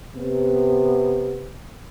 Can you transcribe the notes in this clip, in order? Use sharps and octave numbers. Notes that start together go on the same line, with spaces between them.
C3 B3